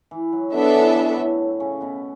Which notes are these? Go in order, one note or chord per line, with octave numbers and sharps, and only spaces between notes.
E3
F#3
F#3 B3 D4 A4 E5
E3
F#3
A2 A3
C#3 C#4
B2 B3